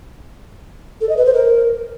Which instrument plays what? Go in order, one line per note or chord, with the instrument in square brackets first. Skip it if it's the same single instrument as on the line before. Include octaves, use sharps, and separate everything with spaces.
[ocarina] A4
D#5
B4
C5
A#4